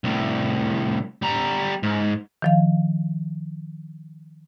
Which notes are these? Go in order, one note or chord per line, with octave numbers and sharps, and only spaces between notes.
C2 A2
G3 A#5
G#2
D#3 F3 F5